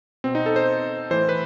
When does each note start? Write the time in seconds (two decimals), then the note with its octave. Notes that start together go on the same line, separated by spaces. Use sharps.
0.24 B2 C4
0.35 D#4
0.46 A4
0.56 C5
1.11 A2 E3 C5
1.29 B4